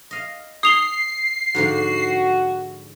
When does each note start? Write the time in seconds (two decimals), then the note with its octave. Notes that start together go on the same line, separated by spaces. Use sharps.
0.11 D#5 F5
0.63 D#6 C7 F7 G7
1.55 G#2 D3 F3 F#4